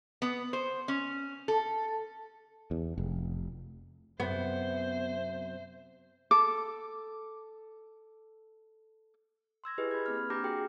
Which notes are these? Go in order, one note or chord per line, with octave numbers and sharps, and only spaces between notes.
B3
C5
C#4
A4
E2
F1
F#2 C3 F#3 B3 C5 E5
A4 D6
C6 E6 G#6 A#6
E4 G4 G#4 B4 D#5
B5 G6 G#6
A#3 C4 F6
D4 G4 A#5 D6 G6 A#6
F#4 G#4 G5